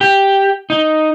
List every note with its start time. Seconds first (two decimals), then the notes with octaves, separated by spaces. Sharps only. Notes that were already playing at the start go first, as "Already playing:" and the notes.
0.01 G4
0.70 D#4